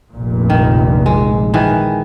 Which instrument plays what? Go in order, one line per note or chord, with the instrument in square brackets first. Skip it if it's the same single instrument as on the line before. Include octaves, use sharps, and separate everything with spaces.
[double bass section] F1 A#1 A#2
[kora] D#3
G#3
D#3 E3 G#4